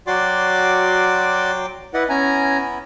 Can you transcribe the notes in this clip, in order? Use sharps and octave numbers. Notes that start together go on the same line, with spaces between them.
F#3 F#4 D5 G5 C6 D6
E4 B4 D5 D#5 F#5
B3 C#4 E4 G#5 A#5